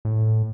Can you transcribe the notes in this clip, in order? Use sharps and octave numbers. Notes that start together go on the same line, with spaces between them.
A2